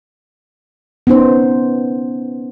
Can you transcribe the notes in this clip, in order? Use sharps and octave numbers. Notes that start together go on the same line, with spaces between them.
B3 C#4 D#4 C5